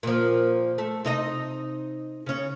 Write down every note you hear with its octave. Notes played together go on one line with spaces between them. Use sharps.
A#2 F3
A3
C3 D#4 D#5
C#3 C#4